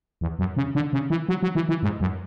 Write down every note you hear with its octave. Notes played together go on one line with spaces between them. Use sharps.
E2
F#2
C#3
D3
C#3
E3
F#3
F#3
E3
E3
G#2
F#2